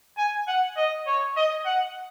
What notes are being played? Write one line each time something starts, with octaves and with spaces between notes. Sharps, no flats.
G#5
F#5
D#5
C#5
D#5
F#5